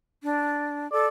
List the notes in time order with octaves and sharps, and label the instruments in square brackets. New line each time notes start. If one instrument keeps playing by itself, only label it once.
[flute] D4
[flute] A4 [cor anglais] D5